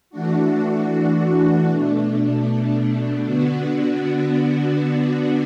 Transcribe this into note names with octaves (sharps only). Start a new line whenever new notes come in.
E3 A3 D4 F#4
B2 A3 D4
D3 B3 D4 F#4